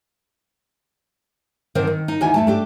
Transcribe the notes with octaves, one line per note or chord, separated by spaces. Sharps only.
D3 D#3 C4 A#4 C5
D#3
D#4
D2 D#3 E3 F#4 G#5
E2 A3 A5
A3 D4 G4